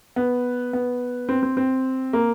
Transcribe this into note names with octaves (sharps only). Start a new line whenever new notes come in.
B3
B3
C4
C4
C4
A#3